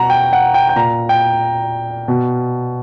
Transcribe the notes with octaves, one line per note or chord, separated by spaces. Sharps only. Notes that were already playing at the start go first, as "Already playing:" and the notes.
Already playing: B2 F#5 A#5
G5
F#5
G5
G5
A#2 A#5
G5
B2